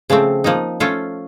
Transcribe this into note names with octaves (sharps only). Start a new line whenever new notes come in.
C#3 F3 A3 C4
F3 A#3 D#4
A3 C#4 F4 A4